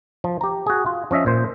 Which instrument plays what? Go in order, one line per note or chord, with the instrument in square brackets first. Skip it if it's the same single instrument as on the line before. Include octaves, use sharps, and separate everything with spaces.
[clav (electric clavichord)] F3
G4 A#5
F#4 G#4
F4
F3 C#4 D#5 E5
A#2 C5